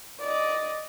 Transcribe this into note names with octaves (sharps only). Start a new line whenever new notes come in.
D5 D#5